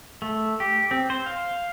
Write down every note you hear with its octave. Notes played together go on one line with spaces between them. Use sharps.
A3
G4
C4
C5
F5